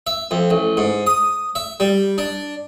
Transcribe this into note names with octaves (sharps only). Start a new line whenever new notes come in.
E5
F2
A1
G#2
D#6
E5
G3
D4